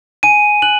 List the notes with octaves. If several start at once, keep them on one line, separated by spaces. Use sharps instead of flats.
G#5 D#7
F#6 F#7